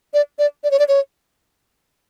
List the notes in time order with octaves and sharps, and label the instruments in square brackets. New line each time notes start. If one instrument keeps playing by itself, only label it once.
[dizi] D5
D5
D5
C#5
D5
C#5